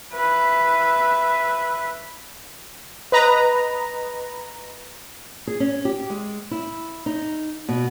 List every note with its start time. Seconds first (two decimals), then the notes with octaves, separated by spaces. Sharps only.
0.13 B4 E5
3.12 B4 D#5 A#5
5.47 G#4
5.60 C#4
5.85 G4
6.10 G#3
6.51 E4
7.06 D#4
7.69 B2